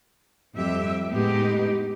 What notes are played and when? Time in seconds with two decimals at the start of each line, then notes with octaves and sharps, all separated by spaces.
0.54 F2 F3 G3 G4 E5
1.10 A2 G#3 B3 D#4 G4